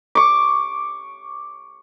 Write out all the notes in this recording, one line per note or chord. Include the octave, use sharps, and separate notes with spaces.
C#6 D6